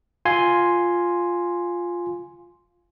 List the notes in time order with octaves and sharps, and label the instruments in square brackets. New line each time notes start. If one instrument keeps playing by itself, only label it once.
[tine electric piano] F4 G#5 C6